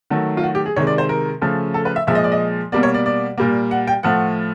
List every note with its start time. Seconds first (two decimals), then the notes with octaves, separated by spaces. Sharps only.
0.10 D#3 F#3 A3
0.37 F4
0.43 F#4
0.55 G4
0.66 G#4
0.76 C3 D#3 G#3 C#5
0.87 D5
0.98 C5
1.09 A#4
1.41 C#3 F3 A3
1.74 A4
1.85 B4
1.96 E5
2.07 A#2 F3 G#3 E5
2.15 D#5
2.24 D5
2.32 D#5
2.72 B2 G3 A#3 D5
2.83 C#5
2.94 D5
3.06 D5
3.38 A#2 G3 A#3
3.71 F#5
3.87 G5
4.03 A2 F3 A3 F#5